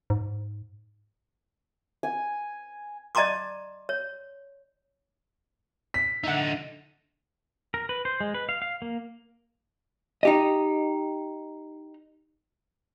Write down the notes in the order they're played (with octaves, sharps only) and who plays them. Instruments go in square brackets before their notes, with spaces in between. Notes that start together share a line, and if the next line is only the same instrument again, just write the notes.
[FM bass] G#2
[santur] G#5
[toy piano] D5 D#5 A5 A#5 C6 D6
C#5
[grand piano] B6
[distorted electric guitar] D3 D#4 [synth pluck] E5 F#5
[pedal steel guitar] A#4
B4
C5
G#3
B4
F5
F5
A#3
[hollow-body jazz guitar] D#4 G4 D#5